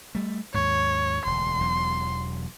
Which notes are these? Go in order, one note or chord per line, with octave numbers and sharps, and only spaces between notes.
G3 A3
D#2 G#2 C#5
E1 D2 C6
E1 E2 F#3